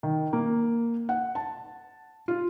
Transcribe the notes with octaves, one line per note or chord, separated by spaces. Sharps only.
D#3
A#3
F#5
A5
F4